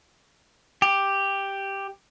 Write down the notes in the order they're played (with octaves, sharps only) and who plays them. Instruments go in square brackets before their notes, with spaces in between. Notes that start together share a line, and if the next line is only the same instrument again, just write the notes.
[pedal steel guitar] G4